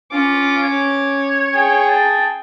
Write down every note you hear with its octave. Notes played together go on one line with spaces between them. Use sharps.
C#4 F4 D6
C#5
G#4 G5
A5